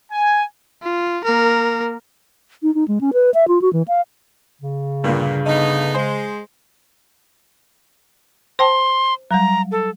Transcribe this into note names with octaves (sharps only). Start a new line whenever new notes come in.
G#5
F4
A#3 A#4
D#4
D#4
G#3
C#4
B4
E5
F4
F#4
E3
F5
C#3
G2 A#2 D3
A3 B3 D#4
G#3 C5
C5 G5 A5 C6
F#3 G3 A#5
A4